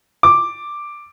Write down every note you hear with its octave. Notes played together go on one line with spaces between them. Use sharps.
D6